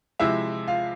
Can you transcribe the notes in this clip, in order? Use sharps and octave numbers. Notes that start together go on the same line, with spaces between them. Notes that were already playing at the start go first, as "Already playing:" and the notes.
C3 F3 G#3 E4 E5
F4 F5